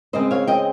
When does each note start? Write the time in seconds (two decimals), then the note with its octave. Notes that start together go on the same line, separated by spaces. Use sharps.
0.13 C#3 G#3 C4 C5 D#5
0.31 C#5 F5
0.47 D#5 G5